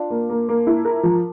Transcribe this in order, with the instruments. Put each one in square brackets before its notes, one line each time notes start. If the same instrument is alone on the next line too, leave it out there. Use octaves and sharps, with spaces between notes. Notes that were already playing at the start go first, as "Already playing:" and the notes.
Already playing: [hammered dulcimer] D4 F4
[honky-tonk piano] A#3
A#3
A#3
E4
A#4
F3